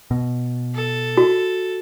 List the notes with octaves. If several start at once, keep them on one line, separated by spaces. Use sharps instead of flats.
B2
A4
F#4